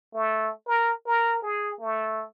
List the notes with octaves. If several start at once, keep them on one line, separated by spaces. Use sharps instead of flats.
A3
A#4
A#4
G#4
A3